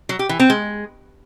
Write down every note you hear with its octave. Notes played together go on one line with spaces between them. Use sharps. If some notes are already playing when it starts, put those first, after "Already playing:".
F#3
G4
E3
C4
G#3